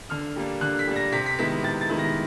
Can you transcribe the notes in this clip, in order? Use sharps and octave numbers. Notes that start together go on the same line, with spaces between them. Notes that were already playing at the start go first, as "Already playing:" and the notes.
D3 F6
G3 A#3 D4
D3 F#6
B6
G3 A#3 D4
A#6
C3 B6
B6
D#3 G#3 B3 E4 B6
C3 A6
A6
D#3 G#3 B3 E4
A#6